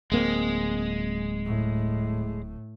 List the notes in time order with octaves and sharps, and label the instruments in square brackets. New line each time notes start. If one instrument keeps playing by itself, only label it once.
[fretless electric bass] D1 A#3 C4 [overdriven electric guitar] G#3
[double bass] A2